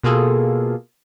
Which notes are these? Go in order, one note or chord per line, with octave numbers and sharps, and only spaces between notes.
B2 A#3 F4 G#4 A4